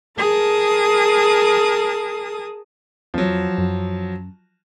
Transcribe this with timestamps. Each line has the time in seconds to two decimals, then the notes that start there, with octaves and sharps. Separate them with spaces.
0.18 G#4 A#4 A5 D#6
3.14 F2 F3 F#3
3.58 F#2